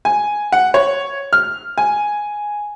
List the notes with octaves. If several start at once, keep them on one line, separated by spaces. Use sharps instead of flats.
G#5
F#5
C#5
F6
G#5